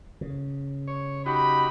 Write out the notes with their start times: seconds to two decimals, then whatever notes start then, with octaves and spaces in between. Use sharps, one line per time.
0.21 C#3
0.88 C#5
1.26 D#4 F#4 G4 B5